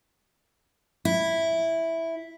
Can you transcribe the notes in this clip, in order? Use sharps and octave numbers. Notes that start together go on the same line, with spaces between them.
E4